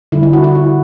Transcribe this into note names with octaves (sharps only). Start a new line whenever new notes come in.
D3 G3 E4
E4
F#4
F#4
E4